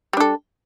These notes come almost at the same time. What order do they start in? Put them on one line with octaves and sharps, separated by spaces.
G3 D4 A4